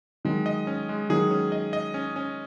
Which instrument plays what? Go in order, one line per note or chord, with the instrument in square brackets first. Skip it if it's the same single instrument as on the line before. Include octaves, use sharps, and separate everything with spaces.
[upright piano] D#3 F#3 [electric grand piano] G#3
[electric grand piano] D#5
C#4
G#3
[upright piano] D#3 F#3 [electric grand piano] G#4
[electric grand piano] C#4
D#5
D#5
C#4
C#4